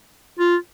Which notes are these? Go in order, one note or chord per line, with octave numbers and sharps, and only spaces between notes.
F4